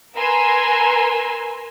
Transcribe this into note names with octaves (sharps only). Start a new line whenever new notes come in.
A#4 B4 G#5 A#5 C6 E6